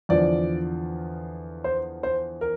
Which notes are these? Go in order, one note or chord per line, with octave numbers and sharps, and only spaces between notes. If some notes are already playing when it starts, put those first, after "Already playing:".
E2 D3 F3 D5
C5
C5
A#4